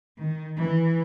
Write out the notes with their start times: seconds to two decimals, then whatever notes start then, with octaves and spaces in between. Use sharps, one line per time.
0.18 D#3
0.57 E3